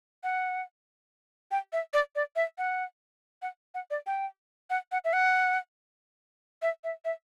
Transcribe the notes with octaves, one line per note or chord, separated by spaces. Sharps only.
F#5
G5
E5
D5
D5
E5
F#5
F#5
F#5
D5
G5
F#5
F#5
E5
F#5
E5
E5
E5